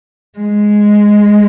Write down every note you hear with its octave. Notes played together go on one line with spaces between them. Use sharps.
G#3